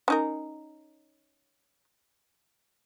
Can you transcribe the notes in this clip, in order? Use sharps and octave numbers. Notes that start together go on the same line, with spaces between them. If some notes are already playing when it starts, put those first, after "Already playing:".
C#4 D#4 A#4